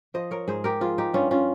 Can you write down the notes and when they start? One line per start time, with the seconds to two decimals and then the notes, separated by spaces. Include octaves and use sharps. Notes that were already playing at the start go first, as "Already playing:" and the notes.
0.14 F3 C5 D#5
0.31 A#4 C#5
0.48 G#2 G#4 C5
0.64 G4 A#4
0.81 F3 F4 G#4
0.98 D#4 G4
1.13 G2 C#4 F4
1.31 C#4 F4